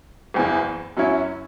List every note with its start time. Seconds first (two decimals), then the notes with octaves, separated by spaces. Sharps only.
0.34 F#1 E2 E3
0.97 F#2 F#3 C#4 E4